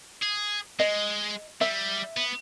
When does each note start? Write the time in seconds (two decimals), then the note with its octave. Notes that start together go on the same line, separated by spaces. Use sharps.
0.22 G#4
0.80 G#3 D#5
1.61 G3 E5
2.17 B3